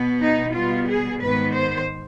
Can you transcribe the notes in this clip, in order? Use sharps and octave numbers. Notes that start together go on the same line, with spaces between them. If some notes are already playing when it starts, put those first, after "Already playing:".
Already playing: B2 B3
D#4
B2 G3 B3 F4
G#4
G#2 D#3 B3 B4
C5